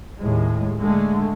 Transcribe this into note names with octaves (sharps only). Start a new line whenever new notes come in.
D#2 A2 G#3
D3 G#3 A3